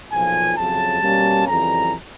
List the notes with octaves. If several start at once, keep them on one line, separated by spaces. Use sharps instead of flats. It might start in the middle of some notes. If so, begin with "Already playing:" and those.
B1 A#2 F3 G#5
F2 C#3 F#3 A5
B2 G3 A#3 C#4
F2 C#3 E3 G3 A#5